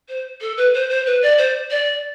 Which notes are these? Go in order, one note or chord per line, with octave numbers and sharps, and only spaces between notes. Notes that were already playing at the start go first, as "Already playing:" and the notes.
C5
A4
B4
C5
C5
B4
D5
C5
D5